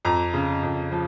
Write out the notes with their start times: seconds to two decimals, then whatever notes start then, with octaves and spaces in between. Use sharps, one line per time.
0.05 F2 A#5
0.34 C#3
0.63 F2
0.92 F3